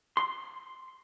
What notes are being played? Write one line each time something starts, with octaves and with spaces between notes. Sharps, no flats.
C6